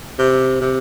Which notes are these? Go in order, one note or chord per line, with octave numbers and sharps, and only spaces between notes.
C3
C3